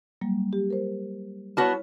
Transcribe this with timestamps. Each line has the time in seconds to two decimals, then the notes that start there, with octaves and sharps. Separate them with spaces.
0.21 F#3 G3 A#3
0.53 G4
0.70 A#4 C5
1.57 B3 E4 F#4 C#5 A5 F6